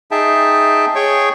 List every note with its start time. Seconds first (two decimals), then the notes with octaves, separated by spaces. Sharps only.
0.11 D#4 G#4 E5 G5 A5
0.95 G#4 C#5 G5 C#6